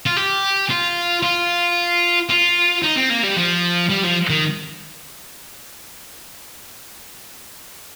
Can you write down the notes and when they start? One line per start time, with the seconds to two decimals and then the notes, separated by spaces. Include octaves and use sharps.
0.06 F4
0.17 G4
0.70 F4
1.23 F4
2.29 F4
2.83 D#4
2.96 C4
3.10 A#3
3.23 G3
3.36 F3
3.89 G3
4.03 F3
4.30 D#3